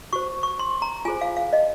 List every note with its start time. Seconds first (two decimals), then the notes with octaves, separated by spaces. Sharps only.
0.13 F#4 C5 C#6
0.43 C#6
0.59 C6
0.82 A#5
1.05 F4 G#4 C5 G#5
1.21 F5
1.37 F5
1.53 D#5